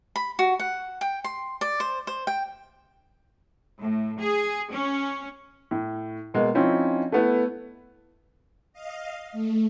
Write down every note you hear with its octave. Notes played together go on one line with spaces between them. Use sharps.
B5
F#4
F#5
G5
C6
D5
C5
C5
G5
A2
G#4
C#4
A2
B2 G#3 A#3
F3 C4 C#4 D#4 E4
A3 B3 E4
D#5 F5
A3